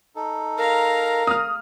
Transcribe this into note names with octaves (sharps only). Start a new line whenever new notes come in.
D#4 A4
A#4 F5 A#5
D#6 F6